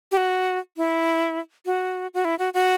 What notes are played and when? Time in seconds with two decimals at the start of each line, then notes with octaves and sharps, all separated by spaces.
0.12 G4
0.17 F#4
0.77 E4
1.66 F#4
2.14 F#4
2.25 E4
2.39 F#4
2.54 F#4